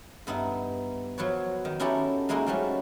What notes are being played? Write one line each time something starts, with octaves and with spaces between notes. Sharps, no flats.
G2 B3 D#4 E4
F3 F#3 F#4 B4 C#5
D#3
C#4 D#4 E4 F#4 G4 A4
G#3 A#3 D#4 E4 F#4 G#4
F3 G3 A3 C#4 F#4